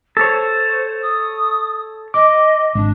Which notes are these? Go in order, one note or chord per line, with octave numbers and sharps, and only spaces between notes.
A4 C5 C#5
D#6
D#5 D6
G#1 D4